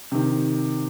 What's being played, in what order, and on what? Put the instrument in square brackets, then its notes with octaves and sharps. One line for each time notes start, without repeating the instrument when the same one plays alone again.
[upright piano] C3 D#3